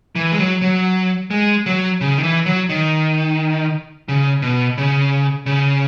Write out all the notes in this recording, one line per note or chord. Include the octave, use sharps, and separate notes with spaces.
E3
G#3
F#3
F#3
G#3
F#3
C#3
D#3
E3
F#3
D#3
C#3
B2
C#3
C#3